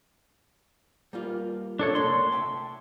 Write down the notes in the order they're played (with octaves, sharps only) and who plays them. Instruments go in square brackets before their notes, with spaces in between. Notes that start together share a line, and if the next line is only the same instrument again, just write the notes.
[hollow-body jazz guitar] G3 A#3 F4
[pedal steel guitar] D4 A4 C#5
[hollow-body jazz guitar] C3 A3 A#3 [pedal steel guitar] C6
[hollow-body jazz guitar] E5 G5 A5